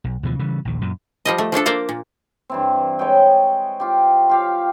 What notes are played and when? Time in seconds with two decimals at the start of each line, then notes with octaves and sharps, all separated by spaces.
0.04 B1
0.23 D2 B2 E3 F3
0.39 C#3 E3 G3
0.65 A#1 D#2
0.81 F#2 A#2
1.25 F3 G3 D#5
1.38 A3
1.52 F3 A3 D4 A4
1.66 A#3 C5 D5 F5
1.89 A#2
2.50 G2 E3 C4
2.99 G#3 C#5 D#5 G5
3.80 F4 G4
4.29 F4 G4 F5